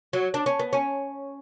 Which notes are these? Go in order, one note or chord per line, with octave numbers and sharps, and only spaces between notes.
F#3
D4
C#4
B3
C#4